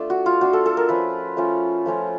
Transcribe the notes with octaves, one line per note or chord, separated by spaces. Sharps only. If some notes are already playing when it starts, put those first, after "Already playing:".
Already playing: A3 D4 F4
F#4
F4
A3 D4 F4 F#4
A4
A4
A#4
F3 A3 C#4 F4 B4
F3 A3 C#4 F4
F3 A3 C#4 F4